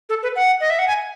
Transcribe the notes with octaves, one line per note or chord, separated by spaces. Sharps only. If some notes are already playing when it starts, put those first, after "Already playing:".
A4
B4
F#5
D#5
E5
F#5
G#5